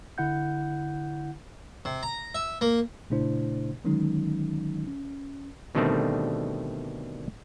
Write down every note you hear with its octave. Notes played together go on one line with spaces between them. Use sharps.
D3 E4 F#5 G6
C3
A#5
E5
A#3
A#2 C#3 A3 D4 E4 C5
D3 D#3 F#3 G#3 C#4 D#4
C#4
B2 D3 D#3 G3 A3 C4